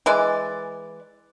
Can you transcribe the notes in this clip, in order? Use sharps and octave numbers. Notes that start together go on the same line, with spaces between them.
E3 G#3 D5